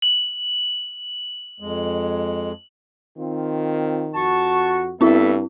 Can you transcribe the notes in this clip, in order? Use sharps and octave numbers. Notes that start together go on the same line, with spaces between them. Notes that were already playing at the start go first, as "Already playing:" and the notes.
F#7
F2 G#3
D#3 C4 F4
F2 F#4 A5 C#6
G2 B3 C4 E4 A4 E5